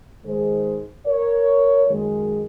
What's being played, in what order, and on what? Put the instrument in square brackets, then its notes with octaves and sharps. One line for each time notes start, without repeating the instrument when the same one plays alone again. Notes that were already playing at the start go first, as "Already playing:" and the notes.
[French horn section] G#2 D#3 G#3 G#4 C5
A#4 C#5
F#2 D#3 G#3